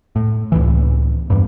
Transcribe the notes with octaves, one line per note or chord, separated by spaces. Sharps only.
A2
C#2 A2 E3
E2 G2